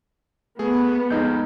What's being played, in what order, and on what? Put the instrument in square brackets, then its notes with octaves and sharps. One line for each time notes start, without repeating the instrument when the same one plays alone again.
[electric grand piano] A3 G#4 [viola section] B3
[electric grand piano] F2 G#3 [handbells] D#4 D#5 G6